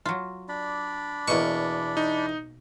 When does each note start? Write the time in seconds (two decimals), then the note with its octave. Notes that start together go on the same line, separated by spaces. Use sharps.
0.05 F#3 F4
0.49 D4 D5 B5
1.28 E2 B2 A#3 C#6
1.97 D#4